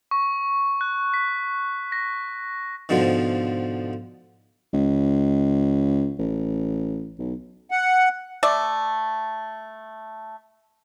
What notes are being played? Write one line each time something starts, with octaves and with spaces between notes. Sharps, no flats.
C#6
F#6
B6
A#6
G#2 B2 D3 F3
C#2
A1
B1
F#5
A3 D5